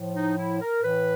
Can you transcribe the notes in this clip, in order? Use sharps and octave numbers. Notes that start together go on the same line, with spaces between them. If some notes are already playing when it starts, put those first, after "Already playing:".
Already playing: A2 F3
D#4
E4
A#4
A2 E3 B4